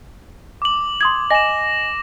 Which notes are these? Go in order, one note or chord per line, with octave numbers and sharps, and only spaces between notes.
D6 F#7
C6 D#6 G#6
D#5 G#5 A#6 E7